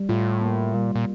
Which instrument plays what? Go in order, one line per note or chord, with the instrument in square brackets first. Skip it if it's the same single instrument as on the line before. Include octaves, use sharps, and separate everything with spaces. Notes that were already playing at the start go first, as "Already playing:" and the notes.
Already playing: [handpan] G3
[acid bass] A2 [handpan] F4
[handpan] A#3
[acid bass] A#2 [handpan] G3
[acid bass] A#2